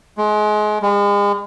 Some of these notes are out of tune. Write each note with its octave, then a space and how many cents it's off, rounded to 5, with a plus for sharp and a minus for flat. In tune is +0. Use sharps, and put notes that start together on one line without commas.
G#3 +30
G#3 -40